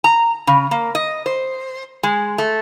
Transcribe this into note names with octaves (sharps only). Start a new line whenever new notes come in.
A#5
C#3
A#3
D#5
C5
G#3
A3